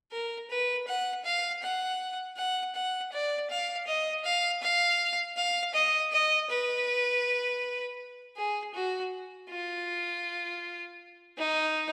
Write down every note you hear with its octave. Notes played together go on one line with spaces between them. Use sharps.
A#4
B4
F#5
F5
F#5
F#5
F#5
D5
F5
D#5
F5
F5
F5
D#5
D#5
B4
G#4
F#4
F4
D#4